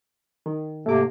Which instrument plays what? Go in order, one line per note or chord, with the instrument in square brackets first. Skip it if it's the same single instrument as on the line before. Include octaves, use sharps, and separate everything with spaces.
[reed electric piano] D#3
[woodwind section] G#2 C3 A#3 [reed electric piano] A3 D6